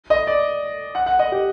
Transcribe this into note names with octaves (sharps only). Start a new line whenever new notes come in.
D#5
D5
F#5
F#5
D#5
G4